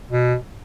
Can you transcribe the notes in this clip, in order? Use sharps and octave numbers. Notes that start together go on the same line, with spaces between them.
B2